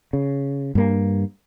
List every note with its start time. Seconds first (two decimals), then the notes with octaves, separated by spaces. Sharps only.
0.13 C#3
0.75 G2 A#3